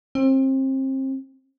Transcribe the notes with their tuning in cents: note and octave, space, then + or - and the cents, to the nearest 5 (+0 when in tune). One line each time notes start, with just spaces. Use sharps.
C4 +30